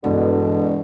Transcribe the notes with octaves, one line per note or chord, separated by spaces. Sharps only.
E1 G2 B2 D3 E3